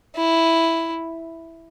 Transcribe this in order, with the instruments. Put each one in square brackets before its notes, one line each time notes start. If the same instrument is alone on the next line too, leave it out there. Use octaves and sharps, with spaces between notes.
[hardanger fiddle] E4